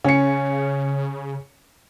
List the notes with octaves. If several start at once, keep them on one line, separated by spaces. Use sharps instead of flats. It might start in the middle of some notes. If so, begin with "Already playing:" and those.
C#3 C#4 C#7